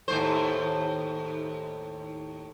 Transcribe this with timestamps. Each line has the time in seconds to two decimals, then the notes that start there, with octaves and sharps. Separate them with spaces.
0.08 D#2 A2 C5